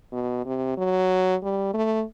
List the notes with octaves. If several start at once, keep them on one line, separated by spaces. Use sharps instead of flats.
B2
C3
F#3
G3
A3